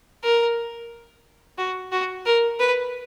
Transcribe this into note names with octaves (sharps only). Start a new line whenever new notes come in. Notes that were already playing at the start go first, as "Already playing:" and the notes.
A#4
F#4
F#4
A#4
B4